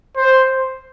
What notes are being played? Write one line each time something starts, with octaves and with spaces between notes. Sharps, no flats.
C5